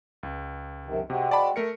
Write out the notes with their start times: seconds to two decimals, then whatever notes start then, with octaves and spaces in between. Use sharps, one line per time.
0.23 C#2
0.85 F#2 C3 D#3
1.10 C3 G#3 C4 F#4
1.31 D5 A5 B5
1.56 A3 A#4 C#7